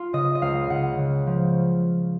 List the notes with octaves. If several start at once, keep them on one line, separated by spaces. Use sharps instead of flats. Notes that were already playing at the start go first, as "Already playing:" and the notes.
Already playing: F4
C#3 D#5
D#5
C#2 F5
C#3 F#5
C#3
F3